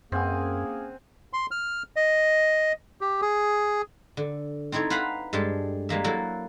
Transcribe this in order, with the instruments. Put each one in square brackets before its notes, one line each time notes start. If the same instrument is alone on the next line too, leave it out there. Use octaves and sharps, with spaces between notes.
[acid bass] F#2 [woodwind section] A#3 C#4 G#4 [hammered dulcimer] C4 F#5 G#5
[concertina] C6
F6
D#5
G4
G#4
[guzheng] D3
C4 D#4 E4 A4 C#5
B4 C5 F5 F#5 A#5 B5
G2 G#3 D4 A4 A5
G3 G#3 A#3 E5
F#3 A#3 E4 F#4 A4